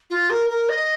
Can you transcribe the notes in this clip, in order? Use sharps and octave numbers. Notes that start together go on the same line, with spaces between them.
F4
A#4
A#4
D#5